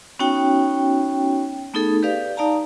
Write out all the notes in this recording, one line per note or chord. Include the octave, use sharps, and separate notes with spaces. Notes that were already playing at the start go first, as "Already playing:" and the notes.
B3 C#4 D#4 F#4 C#5 G5
A3 B3 D#4 G#4 A4
G4 B4 D5 F5
D#4 D5 F5 A5 A#5